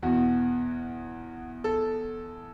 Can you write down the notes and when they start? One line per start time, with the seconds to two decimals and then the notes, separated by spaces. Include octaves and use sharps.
0.03 E2 B2 F#4
1.64 A4